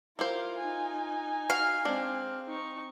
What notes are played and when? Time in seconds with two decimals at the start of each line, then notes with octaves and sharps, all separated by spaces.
0.19 E4 F4 G4 A#4 C5 F5
0.58 D#4 G#5
1.50 F#4 F5
1.85 G#3 C4 D4
2.48 D#4 C#6